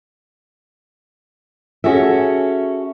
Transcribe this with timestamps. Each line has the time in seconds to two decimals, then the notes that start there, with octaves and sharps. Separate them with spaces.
1.84 C#4 F#4 G#4 A4 E5